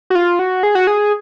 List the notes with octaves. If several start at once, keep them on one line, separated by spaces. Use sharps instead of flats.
F#4
F4
F#4
G#4
F#4
G#4